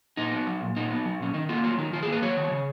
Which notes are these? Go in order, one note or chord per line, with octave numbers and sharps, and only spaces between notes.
A#2 D#4
B3
F#3
A#2
A#2 D#4
B3
F#3
A#2 C#4
D#3 D#4
A#3 F4
F#3 F4
D#3 D#4
D#3 F4
G#4
A#3
B4
F#3 C#5
D#3
C#3